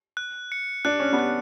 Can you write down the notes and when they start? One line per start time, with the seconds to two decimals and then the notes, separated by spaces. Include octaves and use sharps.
0.17 F#6
0.52 C#7
0.85 D4 F#6
1.00 C#4
1.12 B3 D4
1.19 F#6